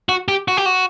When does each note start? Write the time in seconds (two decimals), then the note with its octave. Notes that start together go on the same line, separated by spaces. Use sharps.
0.09 F#4
0.28 G4
0.48 F#4
0.57 G4
0.66 F#4